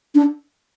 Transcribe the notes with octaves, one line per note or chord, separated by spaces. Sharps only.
D4